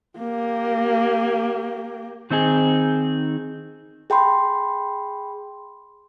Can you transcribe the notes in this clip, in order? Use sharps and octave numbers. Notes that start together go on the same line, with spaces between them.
A#3 G4
D#3 C4 D#4 G#4
G#4 G5 B5 C6